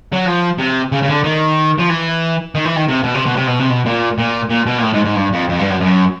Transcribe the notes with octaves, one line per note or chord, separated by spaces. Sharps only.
F#3
F3
C3
C#3
C#3
D3
D#3
F3
E3
D#3
E3
D#3
C3
B2
C3
B2
C3
B2
C3
B2
A#2
A#2
A#2
B2
A#2
A2
G#2
G#2
G2
F2
F2
G2
F#2
F#2